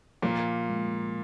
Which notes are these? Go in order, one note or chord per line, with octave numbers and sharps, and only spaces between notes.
A#2 F3 A#3
G#3